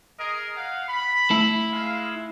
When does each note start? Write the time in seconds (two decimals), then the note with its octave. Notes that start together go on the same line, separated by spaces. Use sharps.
0.19 G#4 A#4 D#5
0.57 F5 F#5
0.89 B5
1.31 A3 E4
1.73 G#3 F5